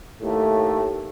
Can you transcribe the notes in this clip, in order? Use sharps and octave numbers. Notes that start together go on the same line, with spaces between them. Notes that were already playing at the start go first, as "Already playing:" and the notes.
D#2 A2 A3